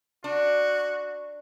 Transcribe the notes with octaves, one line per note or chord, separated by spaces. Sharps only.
D4 F#4